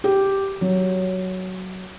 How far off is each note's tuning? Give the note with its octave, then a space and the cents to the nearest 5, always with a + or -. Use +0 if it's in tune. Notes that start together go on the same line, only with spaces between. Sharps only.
G4 -5
F#3 +10